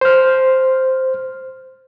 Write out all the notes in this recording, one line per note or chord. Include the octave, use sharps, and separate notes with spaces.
C5 F6